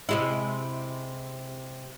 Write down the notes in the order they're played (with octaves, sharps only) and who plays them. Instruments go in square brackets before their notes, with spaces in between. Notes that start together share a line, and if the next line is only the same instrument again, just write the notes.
[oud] C3 G#3 E4